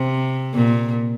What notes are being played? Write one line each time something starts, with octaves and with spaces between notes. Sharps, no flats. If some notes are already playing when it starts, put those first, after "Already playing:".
Already playing: C3
A#2